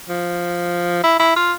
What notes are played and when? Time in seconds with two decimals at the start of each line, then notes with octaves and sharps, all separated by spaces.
0.09 F3
1.04 E4
1.19 E4
1.36 F4